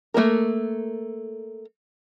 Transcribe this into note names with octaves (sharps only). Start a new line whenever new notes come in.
A3 A#3 A4 A#4